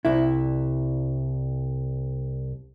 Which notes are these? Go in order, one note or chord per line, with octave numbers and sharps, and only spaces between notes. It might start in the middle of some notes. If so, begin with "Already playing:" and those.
C2 E4